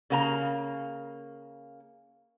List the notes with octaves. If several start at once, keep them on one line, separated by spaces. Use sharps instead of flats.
C#3 A#3 A#5